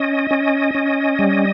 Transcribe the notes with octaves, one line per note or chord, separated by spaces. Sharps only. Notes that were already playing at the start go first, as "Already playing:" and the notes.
Already playing: C#4 D#5
C#4
C#4
G3